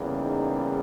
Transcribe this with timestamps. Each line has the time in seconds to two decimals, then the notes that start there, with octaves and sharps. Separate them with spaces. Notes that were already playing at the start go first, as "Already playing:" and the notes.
Already playing: E2 C#3 G3 A#3
0.21 D#4